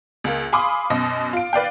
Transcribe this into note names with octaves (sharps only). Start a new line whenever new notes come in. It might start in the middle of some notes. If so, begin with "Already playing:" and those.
C#2 A#3
F5 G#5 B5 C6 D6 D#6
F#2 B2 D#5
F4 D7
B4 D5 F5 G5